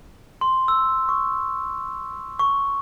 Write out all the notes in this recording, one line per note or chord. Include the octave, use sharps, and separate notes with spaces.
C6
E6
C#6
C#6